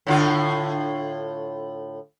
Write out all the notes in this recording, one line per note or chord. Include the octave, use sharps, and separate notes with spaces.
A2 D3 F4